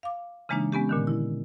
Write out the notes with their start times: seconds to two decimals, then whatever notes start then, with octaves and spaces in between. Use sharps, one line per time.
0.03 F5 D6
0.49 C#3 E3 G#3 A#3 D4 D#4
0.72 G#3 B3 C#4 G4
0.89 A#2 D3 D#3
1.07 E4